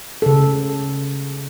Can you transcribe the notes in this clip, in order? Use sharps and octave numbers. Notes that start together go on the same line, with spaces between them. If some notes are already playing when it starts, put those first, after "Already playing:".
C#3 A4